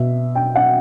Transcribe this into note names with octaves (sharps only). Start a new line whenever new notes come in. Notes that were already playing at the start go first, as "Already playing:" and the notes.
Already playing: B2 E5
G5
F#5